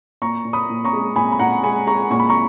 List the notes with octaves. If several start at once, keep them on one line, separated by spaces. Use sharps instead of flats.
A#2 A#5 C#6
A#2
B5 D#6
A#2
A#5 C#6
G#3
A#2 G#5 B5
B5
A#2 F#5 A#5
G#3 G#5 B5
G#3 A#5 C#6
A#2 C#6
B5
A#5 C#6